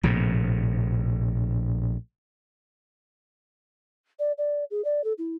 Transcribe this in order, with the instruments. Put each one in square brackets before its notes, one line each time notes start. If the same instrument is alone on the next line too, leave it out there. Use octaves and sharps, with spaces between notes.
[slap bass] A#1 A2 C3
[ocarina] D5
D5
G#4
D5
A4
E4